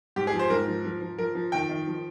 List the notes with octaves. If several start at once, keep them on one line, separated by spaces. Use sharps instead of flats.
G#2 G4
G#4
F3
C5
G#2 A#4
F3
F3
F3
F3 A#4
F3
D#3 G5
D#3
F3